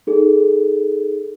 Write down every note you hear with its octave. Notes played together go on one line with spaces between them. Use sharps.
D#4 G#4 A4